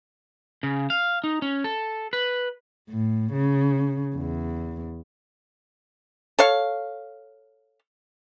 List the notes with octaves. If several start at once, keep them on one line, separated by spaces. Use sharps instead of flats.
C#3
F5
D#4
C#4
A4
B4
A2
C#3
E2
A4 C#5 F5